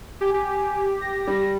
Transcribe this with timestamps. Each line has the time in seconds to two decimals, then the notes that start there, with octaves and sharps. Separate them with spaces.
0.21 G4 G#5
0.34 G4
1.01 A#6
1.27 G3